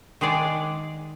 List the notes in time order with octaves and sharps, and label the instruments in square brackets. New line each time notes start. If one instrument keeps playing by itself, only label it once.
[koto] D#3 G#3 G#4 D5 F#5